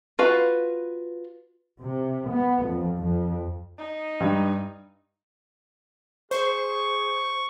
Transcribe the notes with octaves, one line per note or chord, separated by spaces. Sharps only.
F4 F#4 B4 F5
C3
B3
F2
F2
D#4
G2
G#4 C5 C#6